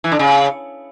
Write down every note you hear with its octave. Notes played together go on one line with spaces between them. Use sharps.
E3
D3
C#3